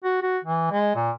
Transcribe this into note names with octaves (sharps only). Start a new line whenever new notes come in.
F#4
F#4
E3
G#3
A#2